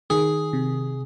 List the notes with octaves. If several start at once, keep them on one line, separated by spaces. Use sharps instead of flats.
D#3 G#4
C3